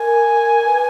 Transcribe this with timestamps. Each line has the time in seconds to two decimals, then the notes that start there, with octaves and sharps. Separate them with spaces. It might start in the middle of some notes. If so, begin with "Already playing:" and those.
Already playing: A#4 G#5
0.66 B4